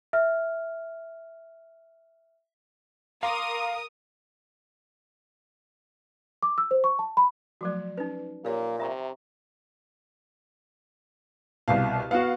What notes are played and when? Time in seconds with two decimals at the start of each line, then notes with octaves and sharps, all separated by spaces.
0.13 E5 F6
3.23 A#4 F5 A#5 C6 D6 D#6
6.43 D6
6.58 E6
6.71 C5
6.84 C#6
6.99 A5
7.17 B5
7.61 F3 F#3 A3 F#4 D5
7.97 C#4 D#4 B4
8.45 A#2 A#3 G4 C#5
8.80 C3 E5 A#5 C#6
11.68 C2 B2 F5
12.11 B3 F#4 F5